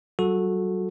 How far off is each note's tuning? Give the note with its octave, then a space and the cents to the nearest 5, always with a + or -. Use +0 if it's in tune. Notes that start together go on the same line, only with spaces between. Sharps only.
F#3 +40 F#4 -20 A4 -5